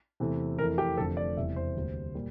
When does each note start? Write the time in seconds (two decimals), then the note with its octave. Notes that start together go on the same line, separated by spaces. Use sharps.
0.20 E2 C3 E3 A3
0.59 F2 E3 A3 A#4
0.78 G4
0.97 F1 F2 D3 F3 A3 A4
1.17 D5
1.37 E1 E2 C3 E3 G3 E5
1.56 C5
1.76 D2 C3 G3 A#3
2.15 A#2 G3 A#3